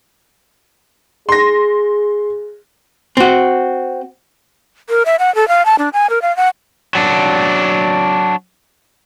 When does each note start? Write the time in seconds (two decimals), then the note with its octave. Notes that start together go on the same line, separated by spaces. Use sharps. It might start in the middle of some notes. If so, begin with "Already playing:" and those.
1.29 G#4 C6 A#6
3.17 C4 F#4
4.89 A#4
5.06 E5
5.19 F#5
5.35 A4
5.48 F5
5.66 A5
5.79 D4
5.93 G#5
6.10 A#4
6.22 F5
6.37 F#5
6.95 F#3 D4